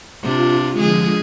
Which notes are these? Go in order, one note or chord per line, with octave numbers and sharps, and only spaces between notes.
C3 D4 F4
D3 F3 G#3 G#4